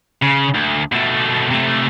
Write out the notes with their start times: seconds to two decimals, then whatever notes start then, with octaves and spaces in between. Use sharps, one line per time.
0.23 C#3
0.55 D2
0.92 B2 A3
1.51 C3 A3